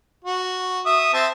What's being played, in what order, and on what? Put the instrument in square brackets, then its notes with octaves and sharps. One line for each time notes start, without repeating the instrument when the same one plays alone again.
[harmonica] F#4
E5 D#6
C4 E5 A5